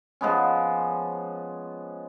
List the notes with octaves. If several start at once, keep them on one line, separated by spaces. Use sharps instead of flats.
F3 G#3 B3 C#4